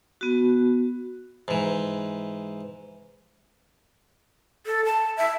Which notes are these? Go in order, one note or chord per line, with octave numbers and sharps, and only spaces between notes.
B3 F#4
G#2 E3
A4
A5
E5